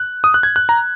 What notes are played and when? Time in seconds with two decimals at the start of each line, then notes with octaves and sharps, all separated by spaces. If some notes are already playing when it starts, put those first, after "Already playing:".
Already playing: F#6
0.24 D#6
0.34 F#6
0.43 G#6
0.56 F#6
0.69 A#5